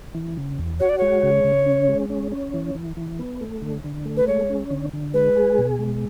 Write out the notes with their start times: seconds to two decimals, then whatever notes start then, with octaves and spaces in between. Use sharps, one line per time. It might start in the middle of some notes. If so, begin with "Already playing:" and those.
0.15 E3
0.37 C#3
0.59 E2
0.80 F#4 C#5
0.89 D5
0.98 G#3 C#5
1.23 C#3
1.44 C#3
1.66 C#4
1.89 G#3
2.10 C#4
2.32 C#4
2.54 E3
2.75 E3
2.97 E3
3.19 B3
3.41 A3
3.62 D3
3.84 D3
4.05 A3
4.17 B4
4.27 G#3 C#5
4.50 C#4
4.71 D3
4.93 D3
5.14 G#3 B4
5.37 G#4
5.58 B2
5.79 G#3